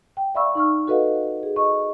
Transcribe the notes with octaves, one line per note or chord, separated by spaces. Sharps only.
G5
D5 E5 F5 B5 C#6 E6
D#4 C#6 F6
F#4 A4 B4 D#5 F5 F#5
G#4
D#5 C#6